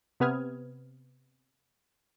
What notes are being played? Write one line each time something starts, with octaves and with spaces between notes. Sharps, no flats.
C3 B3 B4 D#6 F6 G#6